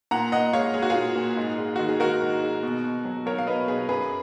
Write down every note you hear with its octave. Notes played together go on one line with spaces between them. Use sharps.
A#2 F#5 A#5
A#2 D#5 F#5
G#3 C#5 F5
G#3 G#4
F#4
F4 G#4
A#2
A#2
G#2
G#3
D#3 F#4
G#4
G#2 F#4 A#4
G#2
G#3
B2
B2
F#3
F#3 A#4 C#5
F5
B2 B4 D#5
B2 G#4 B4
F#2 G#4 B4